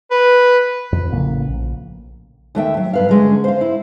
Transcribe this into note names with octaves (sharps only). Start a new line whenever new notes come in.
B4
F2
A1 C#3 A#3
A#1
D#2 A3 E5 G5
F#3
G2 B4 F5
D3 G#3 C#4
C5 F5
E4